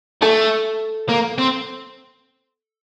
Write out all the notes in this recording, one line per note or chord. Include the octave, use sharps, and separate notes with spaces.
A3 A4
A#3
C4